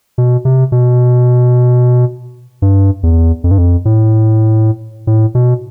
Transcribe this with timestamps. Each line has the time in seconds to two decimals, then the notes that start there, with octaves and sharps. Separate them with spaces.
0.18 B2
0.45 C3
0.72 B2
2.62 G2
3.03 E2
3.44 F2
3.51 G2
3.58 F2
3.85 A2
5.07 A2
5.35 B2